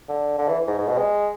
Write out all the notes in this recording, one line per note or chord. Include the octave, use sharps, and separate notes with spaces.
D3
D3
E3
G#2
G#2
B2
G#3